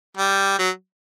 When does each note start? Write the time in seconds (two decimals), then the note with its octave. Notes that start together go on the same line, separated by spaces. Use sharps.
0.17 G3
0.59 F#3